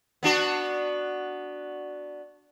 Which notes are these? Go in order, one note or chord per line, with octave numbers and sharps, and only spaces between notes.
B3 D4 F#4